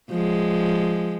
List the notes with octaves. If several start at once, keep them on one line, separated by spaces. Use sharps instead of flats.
F3 G#3